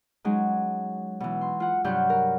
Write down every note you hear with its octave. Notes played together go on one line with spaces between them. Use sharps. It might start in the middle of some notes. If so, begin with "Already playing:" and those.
F#3 G#3 C#4 D#4
B2 E3
C6
F4 F#5
G2 C3 F#3 F#5 F6 G6
A#4